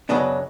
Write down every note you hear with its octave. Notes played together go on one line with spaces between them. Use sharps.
F#2 C#3 F#3 B3 D4 D#5